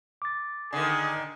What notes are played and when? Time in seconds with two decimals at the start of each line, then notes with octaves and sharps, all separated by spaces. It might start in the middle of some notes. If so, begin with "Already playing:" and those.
0.22 D6 A6
0.73 D3 D#3 G#4